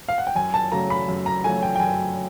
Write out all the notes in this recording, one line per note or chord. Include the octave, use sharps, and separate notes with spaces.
F5
F#5
G5
F#2 G#5
A5
C#3 F#3 A3 A#5
B5
F#2
A#5
C#3 F#3 A3 G#5
G5
G5
F#2 G#5